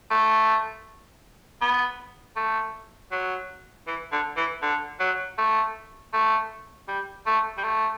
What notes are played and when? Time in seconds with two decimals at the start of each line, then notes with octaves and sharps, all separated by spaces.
0.10 A3
1.62 B3
2.36 A3
3.12 F#3
3.87 E3
4.12 D3
4.37 E3
4.62 D3
5.00 F#3
5.38 A3
6.13 A3
6.88 G3
7.26 A3
7.57 G3
7.64 A3